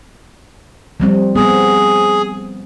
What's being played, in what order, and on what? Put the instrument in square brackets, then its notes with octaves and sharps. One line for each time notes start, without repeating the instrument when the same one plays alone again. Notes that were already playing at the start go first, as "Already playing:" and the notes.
[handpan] F3 G3 C4
[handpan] B3 C4 [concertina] G#4